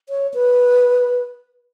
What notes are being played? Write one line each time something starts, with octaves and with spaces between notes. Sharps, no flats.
C#5
B4